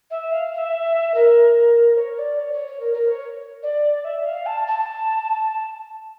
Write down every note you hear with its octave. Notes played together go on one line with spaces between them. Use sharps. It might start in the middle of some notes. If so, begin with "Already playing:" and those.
E5
F5
F5
E5
A#4
C#5
D5
C#5
C#5
C#5
A#4
A#4
C#5
D5
E5
F5
A5
A5